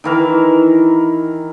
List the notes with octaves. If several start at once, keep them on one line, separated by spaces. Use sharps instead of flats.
D#3 E3 A#4